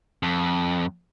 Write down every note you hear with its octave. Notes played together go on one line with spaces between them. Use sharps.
F2